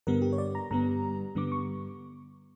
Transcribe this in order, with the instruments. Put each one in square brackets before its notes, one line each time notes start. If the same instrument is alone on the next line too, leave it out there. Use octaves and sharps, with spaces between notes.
[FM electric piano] G2 D3 G3 B3 A#4
G4
C#5
D5
A#5
G2 D3 G3 B3 A#5
G2 D3 G3 B3 D6
C#6